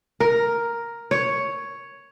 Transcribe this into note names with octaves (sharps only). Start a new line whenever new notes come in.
A#4
C#5